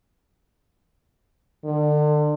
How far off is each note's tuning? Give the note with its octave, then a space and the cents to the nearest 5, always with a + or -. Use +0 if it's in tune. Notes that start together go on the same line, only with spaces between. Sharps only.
D3 +35